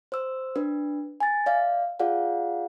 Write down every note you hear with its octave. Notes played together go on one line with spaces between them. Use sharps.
C5 E6
D4 B4
G#5 A6
D5 E5 F5
F4 G#4 D5 F5 F#5